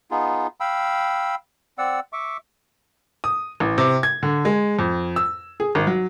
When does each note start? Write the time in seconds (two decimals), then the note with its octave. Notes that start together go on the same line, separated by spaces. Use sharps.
0.11 B3 D#4 F4 G#4
0.60 F5 G5 B5 E6
1.78 C4 D5 F#5 E6
2.13 E5 C#6 D6
3.24 D#6
3.60 A1
3.78 C3
4.03 G#6
4.23 D3
4.45 G#3
4.79 F2
5.16 E6
5.60 G#4
5.75 G#1
5.87 F#3